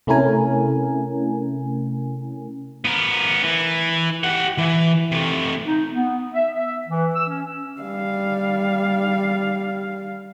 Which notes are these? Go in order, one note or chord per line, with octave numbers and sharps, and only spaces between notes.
C3 A3 C#4 E4 A#4 G#5
B3 A#4
E3
G4 F#5
E3
C3 A3
D#4
B3
E5
E5
E3
E6
C#4
G3 F5